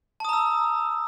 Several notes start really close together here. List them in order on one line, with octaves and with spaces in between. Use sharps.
A5 D#6 A#5 E6